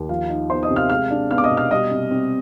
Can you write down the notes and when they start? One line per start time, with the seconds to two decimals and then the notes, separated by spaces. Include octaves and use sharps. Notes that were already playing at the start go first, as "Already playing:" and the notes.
Already playing: D#2
0.09 F3 F4 F5
0.29 D#4
0.49 B3 C5 C6
0.63 D#5 D#6
0.70 C3
0.76 F5 F6
0.90 G#3 F5 F6
1.10 D4
1.31 B3 F5 F6
1.38 D6
1.44 D#5 D#6
1.51 B2
1.57 F5 F6
1.71 G3 D#5 D#6
1.91 C3
2.11 C4